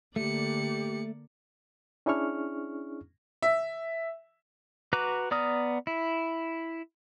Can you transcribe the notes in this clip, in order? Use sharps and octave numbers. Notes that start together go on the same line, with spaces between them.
D3 A3 A#3 G4 D5 C#7
C#4 D4 E4 G#4 C#6 F6
E5
F#4 B4 A#5 D6 F#6
B3 D5 A#5 D#6 F6
E4